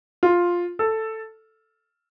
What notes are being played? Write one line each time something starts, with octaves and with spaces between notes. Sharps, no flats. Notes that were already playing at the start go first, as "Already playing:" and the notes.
F4
A4